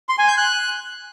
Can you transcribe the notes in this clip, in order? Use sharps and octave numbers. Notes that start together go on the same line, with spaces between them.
C6
G#5
G6
F#6